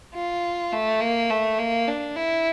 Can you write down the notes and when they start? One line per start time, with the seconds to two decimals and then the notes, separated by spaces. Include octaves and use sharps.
0.14 F4
0.73 A3
1.01 A#3
1.30 A3
1.59 A#3
1.88 D4
2.16 E4